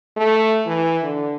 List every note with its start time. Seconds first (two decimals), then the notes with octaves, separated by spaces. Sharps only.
0.17 A3
0.67 E3
1.03 D3